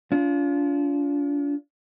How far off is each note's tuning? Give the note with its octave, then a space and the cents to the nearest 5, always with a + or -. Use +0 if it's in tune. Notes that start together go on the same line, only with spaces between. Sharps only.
D4 -45 F4 -5